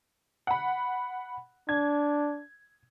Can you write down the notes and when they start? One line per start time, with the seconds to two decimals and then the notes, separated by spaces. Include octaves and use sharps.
0.47 F#5 B5
1.69 D4 G#6